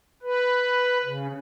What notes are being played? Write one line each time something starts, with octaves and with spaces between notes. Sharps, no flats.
B4
C#3